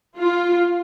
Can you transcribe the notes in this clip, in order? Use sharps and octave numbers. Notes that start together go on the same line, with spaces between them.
F4